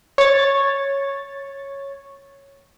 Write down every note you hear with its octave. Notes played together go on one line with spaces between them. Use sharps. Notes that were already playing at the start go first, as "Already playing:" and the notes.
C#5 A6